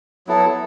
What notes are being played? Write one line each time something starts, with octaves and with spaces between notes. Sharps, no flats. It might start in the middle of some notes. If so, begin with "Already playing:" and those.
F#3 B3 E4 A4